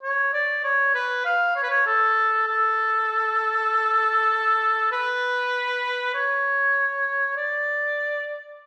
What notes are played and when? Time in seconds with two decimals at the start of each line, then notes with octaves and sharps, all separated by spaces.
0.03 C#5
0.33 D5
0.64 C#5
0.95 B4
1.25 F5
1.56 C#5
1.63 B4
1.70 C#5
1.86 A4
2.47 A4
4.92 B4
6.14 C#5
7.37 D5